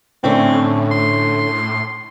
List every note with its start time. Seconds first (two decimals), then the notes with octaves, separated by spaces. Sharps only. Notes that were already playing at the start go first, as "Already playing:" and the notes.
0.24 A2 D3 A3 C4 C#4
0.91 C6